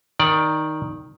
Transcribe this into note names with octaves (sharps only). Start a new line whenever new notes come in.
D#3 D5